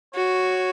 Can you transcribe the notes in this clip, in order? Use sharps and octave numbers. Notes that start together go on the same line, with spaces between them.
F#4 C#5